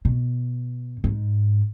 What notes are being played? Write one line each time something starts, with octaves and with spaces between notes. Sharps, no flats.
B2
G#2